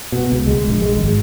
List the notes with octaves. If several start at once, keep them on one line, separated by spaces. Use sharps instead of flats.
B2
C#2
G#3
A#1
G#3
G#1